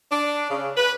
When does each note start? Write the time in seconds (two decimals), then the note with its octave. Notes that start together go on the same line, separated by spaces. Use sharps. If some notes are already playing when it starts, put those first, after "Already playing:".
0.10 D4
0.50 C#3
0.76 B4